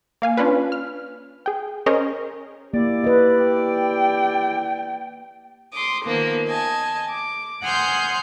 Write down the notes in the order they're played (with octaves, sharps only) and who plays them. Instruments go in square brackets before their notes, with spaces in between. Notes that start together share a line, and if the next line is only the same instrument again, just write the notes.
[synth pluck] A#3 F5 G#5
C#4 D4 F4 B4
F6
G#4 G5
C#4 G#4 A#4 C5 C#5 D#5
[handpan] A#3 [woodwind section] E4 G4 D5
[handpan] B4 D#5
[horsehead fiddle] G5
[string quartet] C6 D6 D#6
D#3 F3 A#3 B3
D#5 G#5 A5
D6
F#5 G#5 C6 D#6 F6 G6